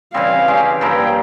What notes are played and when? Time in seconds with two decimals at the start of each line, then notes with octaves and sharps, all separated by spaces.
0.14 C#3 E3 G3 C4 F5
0.48 G#3 C#4 G4
0.81 G2 F3 A#3 E4 G5